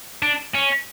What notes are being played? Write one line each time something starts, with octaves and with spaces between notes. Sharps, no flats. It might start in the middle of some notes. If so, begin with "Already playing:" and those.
D4
C#4